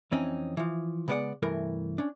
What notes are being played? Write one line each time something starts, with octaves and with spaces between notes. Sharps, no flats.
F2 E3 C4 C#4 D#4
E3 F3
C#3 G#3 B3 A#4 D5 F#5
C2 G2 E3 A3 A#4
C#4 D4